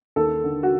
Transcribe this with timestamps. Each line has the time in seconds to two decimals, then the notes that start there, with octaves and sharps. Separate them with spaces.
0.16 D#2 A4
0.44 D3
0.63 F#4